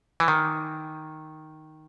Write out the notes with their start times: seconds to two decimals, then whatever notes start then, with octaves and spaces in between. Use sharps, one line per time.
0.20 E3
0.28 D#3